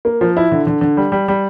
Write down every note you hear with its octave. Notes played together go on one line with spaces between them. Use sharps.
A#3
F3
E4
D3
D3
D3
G3
G3
G3